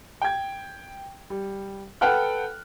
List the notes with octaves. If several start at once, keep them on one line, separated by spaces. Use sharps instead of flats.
G5 G#6
G3
A4 B4 F#5 G5 F6 F#6